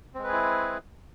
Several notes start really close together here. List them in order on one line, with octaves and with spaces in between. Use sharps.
C4 G#3 B4 G#4 E4